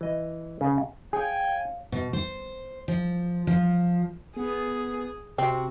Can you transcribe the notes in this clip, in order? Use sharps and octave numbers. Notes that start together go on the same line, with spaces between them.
E3 D#5
C#3
G#4 C#5 F5 G5 G#5
B2
C5
F3
F3
B3 G#4
C3 C4 F#4